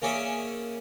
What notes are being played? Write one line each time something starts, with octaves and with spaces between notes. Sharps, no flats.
A#3 C#4 G#4 D5 E5